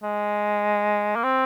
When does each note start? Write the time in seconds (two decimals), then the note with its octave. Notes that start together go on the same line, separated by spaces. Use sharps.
0.03 G#3
1.16 A#3
1.24 C4